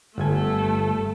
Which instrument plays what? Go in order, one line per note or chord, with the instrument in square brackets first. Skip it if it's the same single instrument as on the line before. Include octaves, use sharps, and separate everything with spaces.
[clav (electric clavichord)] G1 G#5 [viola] A3 A4